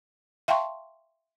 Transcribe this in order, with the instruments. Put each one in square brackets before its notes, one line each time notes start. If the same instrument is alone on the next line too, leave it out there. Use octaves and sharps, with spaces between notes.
[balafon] E5 F5 G5 A5 C6 C#6